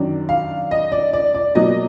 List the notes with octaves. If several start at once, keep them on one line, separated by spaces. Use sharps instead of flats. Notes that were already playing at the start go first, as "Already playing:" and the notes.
Already playing: F#2 D#3 F#3 D4
F5
D#5
D5
D5
D5
B2 F#3 A#3 D#5